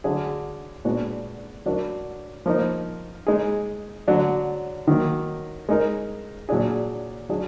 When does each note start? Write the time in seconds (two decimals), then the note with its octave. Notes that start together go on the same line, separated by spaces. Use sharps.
0.04 D3 F#3 D4 G#4
0.85 A#2 G#3 B3 D4 F#4
1.66 F#3 D4 F#4 A#4
2.46 F3 A#3 D#4
3.27 G#3 D#4 G#4
4.08 D3 F#3 D4
4.87 D#3 F#3 A#3
5.69 G#3 D#4 A#4
6.49 A#2 F#3 D4 G#4
7.29 F#3 D4 G#4